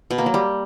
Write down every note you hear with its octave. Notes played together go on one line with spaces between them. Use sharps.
B2
A#3
F#3
G3